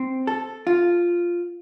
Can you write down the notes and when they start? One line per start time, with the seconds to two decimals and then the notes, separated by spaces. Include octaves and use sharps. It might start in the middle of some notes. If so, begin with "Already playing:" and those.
Already playing: C4
0.27 A4
0.67 F4